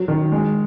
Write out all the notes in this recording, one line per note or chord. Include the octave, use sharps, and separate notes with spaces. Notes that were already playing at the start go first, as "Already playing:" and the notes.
Already playing: F#3
D#3
G#3